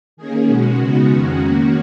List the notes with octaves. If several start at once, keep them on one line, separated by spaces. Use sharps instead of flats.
D#3 A#3 C#4 G#4
B2 G#3 C#4 F#4
C#3 G#3 B3 D#4 F#4
F2 D#3 G#3 C#4 F#4
D#3 A#3 C#4 F#4